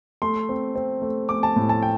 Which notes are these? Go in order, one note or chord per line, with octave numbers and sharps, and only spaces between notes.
A3 C6
C4
C4
A3
A3 D6
A5
A2
A5
G5